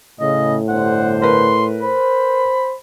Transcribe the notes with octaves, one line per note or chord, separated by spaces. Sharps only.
A2 C#3 D#5
G1 D3 C5 F#5
A#4 B4 C6
C5 B5